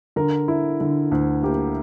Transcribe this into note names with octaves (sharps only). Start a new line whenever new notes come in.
D3 A#4
E4
D3
D2
A#3 G4